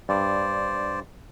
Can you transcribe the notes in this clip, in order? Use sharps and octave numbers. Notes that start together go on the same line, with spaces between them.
G2 C5 D5